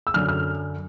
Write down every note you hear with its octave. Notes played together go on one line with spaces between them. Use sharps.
E6
F#2 D3 F#3 F6
F6